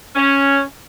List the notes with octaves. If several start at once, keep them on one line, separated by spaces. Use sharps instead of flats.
C#4